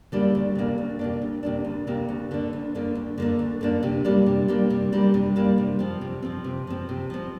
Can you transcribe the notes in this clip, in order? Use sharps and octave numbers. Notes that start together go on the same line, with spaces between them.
D3 G3 A#3 D4
D2
C3 A#3 D4
D2
C3 A#3 D4
D2
C3 A#3 D4
D2
C3 A#3 D4
D2
D3 A#3 D4
D2
D3 A#3 D4
D2
D3 A#3 D4
D2
D3 A#3 D4
C3
G3 A#3 D4
C3
G3 A#3 D4
C3
G3 A#3 D4
C3
G3 A#3 D4
C3
F3 C4
C3
F3 C4
C3
F3 C4
C3
F3 C4